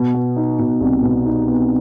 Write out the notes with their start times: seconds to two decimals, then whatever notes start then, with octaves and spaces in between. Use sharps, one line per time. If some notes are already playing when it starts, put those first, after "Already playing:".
Already playing: B2
0.14 B3
0.36 D#4
0.59 B2
0.81 C2
1.03 B2
1.26 D#4
1.48 B3